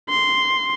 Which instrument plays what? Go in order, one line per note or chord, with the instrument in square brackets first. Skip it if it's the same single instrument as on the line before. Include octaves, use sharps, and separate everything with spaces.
[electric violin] C6